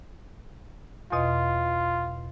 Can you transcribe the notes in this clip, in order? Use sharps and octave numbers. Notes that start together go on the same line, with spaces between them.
E2 B2 F4 D#5